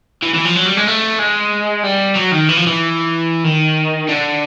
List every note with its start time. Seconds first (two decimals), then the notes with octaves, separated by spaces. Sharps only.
0.23 E3
0.35 E3
0.45 F3
0.56 F#3
0.66 G3
0.77 G#3
0.87 A3
1.19 G#3
1.83 G3
2.15 F#3
2.32 D#3
2.49 E3
2.57 F3
2.67 E3
3.44 D#3
4.08 D3